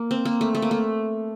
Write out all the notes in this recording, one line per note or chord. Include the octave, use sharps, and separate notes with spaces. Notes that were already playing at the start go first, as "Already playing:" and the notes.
Already playing: A#3
C4
A#3
A3
A3
A#3
A3